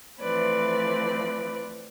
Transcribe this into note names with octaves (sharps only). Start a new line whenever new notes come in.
E3 F3 A3 C4 B4 D5